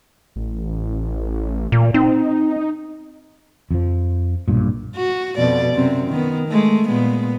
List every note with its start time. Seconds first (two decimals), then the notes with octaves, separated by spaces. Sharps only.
0.36 A1
1.72 A#2
1.94 C4 D#4
3.71 F2 F3
4.48 B1 G2 A#2
4.96 F#4
5.37 F2 B2 D5
5.74 F#2 C3 C4
6.09 D#3 B3
6.48 G#3 A3
6.88 A#2 G#3 B3